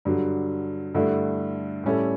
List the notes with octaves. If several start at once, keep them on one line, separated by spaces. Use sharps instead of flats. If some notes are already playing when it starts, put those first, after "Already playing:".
G2 D3 F#3
G2 D3 A3 E4
A2 G3 C#4 E4 A4